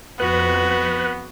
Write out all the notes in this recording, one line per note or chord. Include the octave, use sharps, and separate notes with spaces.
F2 B3 F#4 B4